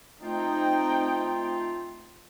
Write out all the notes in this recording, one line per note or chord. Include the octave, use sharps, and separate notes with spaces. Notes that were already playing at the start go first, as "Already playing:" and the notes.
A3 C4 D#4 F4 G5